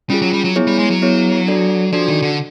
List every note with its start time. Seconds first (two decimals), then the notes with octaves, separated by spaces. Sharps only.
0.10 G3 C#4 F4 G#4
0.22 F#3
0.33 G3
0.44 F#3
0.56 B3 E4 G#4 C#5
0.67 G3
0.79 G#3
0.90 F#3
1.02 B3 E4 G#4 C#5
1.47 D4 F#4 A4 D5
1.93 F3 D4 F#4 A4 D5
2.08 D#3
2.22 D3